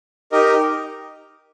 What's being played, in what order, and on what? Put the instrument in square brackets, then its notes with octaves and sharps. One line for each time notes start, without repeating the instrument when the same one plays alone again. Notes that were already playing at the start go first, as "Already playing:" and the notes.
[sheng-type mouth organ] D#4 G4 A#4 D#5